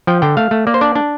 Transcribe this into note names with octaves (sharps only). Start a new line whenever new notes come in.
F3 G5
D3 G5
A3 F5
A3
A#3 D5
C5
D4 D5
D4